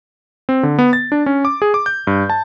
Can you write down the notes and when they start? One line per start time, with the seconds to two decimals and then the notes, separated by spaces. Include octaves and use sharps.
0.49 C4
0.63 D3
0.79 B3
0.93 A6
1.12 D4
1.26 C#4
1.45 D6
1.62 G#4
1.74 D6
1.86 G6
2.07 G2
2.30 A5